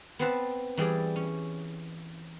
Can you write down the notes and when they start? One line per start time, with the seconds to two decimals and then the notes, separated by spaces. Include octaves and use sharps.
0.19 B3 C4 B4 A5
0.77 E3 G3 G#4 D5
1.16 C#4